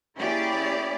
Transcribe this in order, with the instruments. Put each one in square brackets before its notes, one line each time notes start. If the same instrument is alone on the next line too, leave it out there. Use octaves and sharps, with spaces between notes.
[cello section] A#3 C#4 E4 G4 G#4 D5